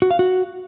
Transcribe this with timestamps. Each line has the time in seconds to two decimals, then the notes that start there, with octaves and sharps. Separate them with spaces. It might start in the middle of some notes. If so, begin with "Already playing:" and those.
0.02 F#4
0.11 F5
0.19 F#4